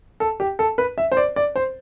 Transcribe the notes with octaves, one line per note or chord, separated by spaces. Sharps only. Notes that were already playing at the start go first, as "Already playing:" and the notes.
A4
G4
A4
B4
E5
C5
D5
D5
C5